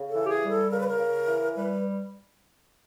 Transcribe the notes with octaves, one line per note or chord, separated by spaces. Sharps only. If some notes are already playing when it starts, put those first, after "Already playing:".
Already playing: C#3
A4
E3
G4
G#4
G3
A4
C#3 A#4
B4
A#4
C#3
E3
G3 B4